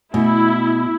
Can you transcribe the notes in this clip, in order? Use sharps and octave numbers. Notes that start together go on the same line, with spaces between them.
B2 A3 E4